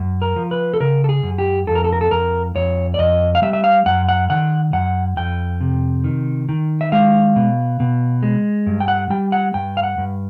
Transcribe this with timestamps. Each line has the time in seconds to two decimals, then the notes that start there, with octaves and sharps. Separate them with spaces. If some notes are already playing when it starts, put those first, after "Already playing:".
Already playing: F#2
0.22 A#4
0.36 F3
0.51 B4
0.74 A4
0.80 C#3 A#4
1.04 A4
1.09 G#4
1.23 F#2
1.38 G4
1.67 F2 A4
1.75 A#4
1.84 A4
1.92 A#4
2.01 A4
2.11 F2 A#4
2.55 F2 C#5
2.94 D5
2.98 F2 D#5
3.35 F5
3.42 G3 E5
3.53 E5
3.64 F5
3.86 F#2 F#5
4.09 F#5
4.30 D#3 F#5
4.73 F#2 F#5
5.17 F2 G5
5.61 C3
6.04 D#3
6.49 D#3
6.81 E5
6.92 G#3 F5
7.36 B2
7.80 B2
8.23 G#3
8.67 G2
8.80 G5
8.88 F#5
9.10 G3 G5
9.32 F#5
9.54 G2 G5
9.77 F5
9.83 F#5
9.98 G2